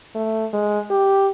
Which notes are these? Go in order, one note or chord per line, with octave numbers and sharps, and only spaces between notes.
A3
G#3
G4